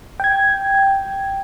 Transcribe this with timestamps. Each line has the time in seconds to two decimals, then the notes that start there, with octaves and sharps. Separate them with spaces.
0.20 G5 G#6